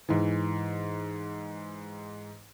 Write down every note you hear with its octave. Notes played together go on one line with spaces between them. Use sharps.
G#2 E3